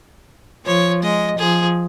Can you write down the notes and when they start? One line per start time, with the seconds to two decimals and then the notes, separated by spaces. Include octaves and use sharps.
0.65 F3 C#5
1.03 G#3 D#5
1.39 F3 G#4